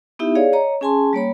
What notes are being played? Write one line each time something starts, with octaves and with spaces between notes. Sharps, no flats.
B3 D#4 E4 G4 E5
G#4 C#5 D5 F5
C#5 D#5 A#5
C#4 G#4 G#5 A5 C6
G3 A#3 C#5 B5